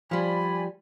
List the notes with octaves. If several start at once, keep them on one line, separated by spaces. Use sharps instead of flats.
F3 G3 D5 G#5 B5